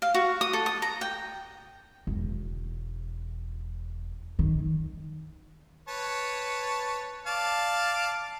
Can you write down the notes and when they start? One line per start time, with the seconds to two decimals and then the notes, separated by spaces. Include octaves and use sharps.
0.02 F5
0.14 F#4
0.41 D#6
0.53 A4
0.66 D#6
0.82 A#5
1.01 G5
2.07 E1
4.39 D#3
5.88 B4 C#5 A5
7.26 D5 F5 A5